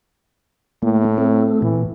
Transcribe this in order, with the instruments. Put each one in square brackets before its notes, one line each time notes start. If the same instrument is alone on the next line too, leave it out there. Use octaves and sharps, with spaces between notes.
[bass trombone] A2 [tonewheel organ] A3 A#3
[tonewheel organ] A3 C4 A4
[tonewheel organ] A#2 [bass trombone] E3